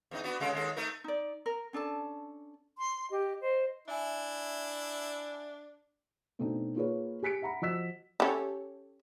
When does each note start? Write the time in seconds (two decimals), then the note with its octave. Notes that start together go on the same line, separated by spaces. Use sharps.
0.11 E2 D#3 D#4
0.24 B3 D4 F#4
0.40 C#3 G#3 A4
0.53 D#2 G#3 A4
0.76 A3 D#4 A#4
1.04 D#4 D5
1.46 A#4
1.73 C#4 D4 A4 A5
2.77 C6
3.11 G4 D#5
3.41 C5 D#5
3.88 D4 E4 E5 G#5
6.39 B2 A3 C4 D4 D#4
6.76 A#3 F4 G#4 B4 C#5
7.23 G4 G#5 B6 C#7 D7
7.42 E5 F#5 A#5 B5
7.62 F3 F#4 D#5 E6 B6 E7
8.20 C#4 E4 G4 A4 C#5